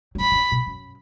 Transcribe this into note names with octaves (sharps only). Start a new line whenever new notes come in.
F#3
E3 B5
E3
D#3
B2
F#2